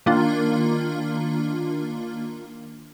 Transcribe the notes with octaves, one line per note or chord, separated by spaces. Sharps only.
D#3 A#3 D4 F4